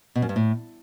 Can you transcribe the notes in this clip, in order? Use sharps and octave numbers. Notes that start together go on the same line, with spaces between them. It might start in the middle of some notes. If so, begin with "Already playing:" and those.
B2
F#2
G2
A2